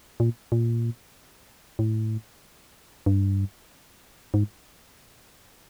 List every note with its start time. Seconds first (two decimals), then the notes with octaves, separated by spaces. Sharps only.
0.20 A#2
0.52 A#2
1.79 A2
3.06 G2
4.34 G#2